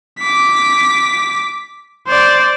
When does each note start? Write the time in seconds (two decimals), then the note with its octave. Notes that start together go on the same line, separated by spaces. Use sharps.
0.19 D6 B6
2.08 C5 D5